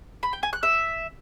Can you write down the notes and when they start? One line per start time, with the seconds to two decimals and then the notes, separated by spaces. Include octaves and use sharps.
0.23 B5
0.33 G5
0.43 G#5
0.53 F#6
0.63 E5